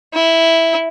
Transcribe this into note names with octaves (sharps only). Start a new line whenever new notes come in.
E4